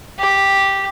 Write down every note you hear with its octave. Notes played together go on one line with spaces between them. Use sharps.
G4